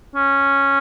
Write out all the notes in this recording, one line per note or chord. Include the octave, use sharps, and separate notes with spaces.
C#4